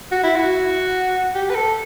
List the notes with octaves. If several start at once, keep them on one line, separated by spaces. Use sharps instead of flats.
F#4
E4
F#4
G4
B4
A4